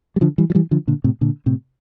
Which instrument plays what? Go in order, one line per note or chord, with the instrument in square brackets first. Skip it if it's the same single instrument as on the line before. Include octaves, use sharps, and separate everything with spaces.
[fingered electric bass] G3
D3 F3
E3 G3
F3
E3 G3
D3 F3
A#2 D3
A2 C3
A#2 D3
A2 C3